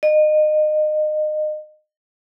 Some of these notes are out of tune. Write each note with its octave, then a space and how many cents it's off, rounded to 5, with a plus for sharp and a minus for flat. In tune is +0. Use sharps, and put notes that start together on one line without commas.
D#5 -30